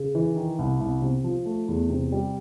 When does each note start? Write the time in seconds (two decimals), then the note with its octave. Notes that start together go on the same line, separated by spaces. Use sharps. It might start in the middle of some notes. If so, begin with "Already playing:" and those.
Already playing: C#3
0.15 E3
0.36 D#3
0.59 C2
0.80 C2
1.02 C3
1.24 F3
1.46 A3
1.68 E2
1.90 C3
2.12 G3